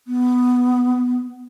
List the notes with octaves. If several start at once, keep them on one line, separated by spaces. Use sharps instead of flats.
B3